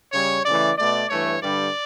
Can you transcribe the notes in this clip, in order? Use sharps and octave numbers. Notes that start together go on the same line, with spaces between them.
C#3 G3 C#5
C#3 E3 A3 D5
B2 A3 D5
G2 E3 A3 C#5
G2 D3 G3 D5